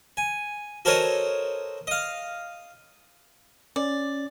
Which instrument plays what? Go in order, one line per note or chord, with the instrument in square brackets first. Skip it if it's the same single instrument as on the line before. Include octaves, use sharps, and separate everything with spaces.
[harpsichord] G#5
F#4 A4 A#4 C5 C#5 D#5
D#5 F5
[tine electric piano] C#4 [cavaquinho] D5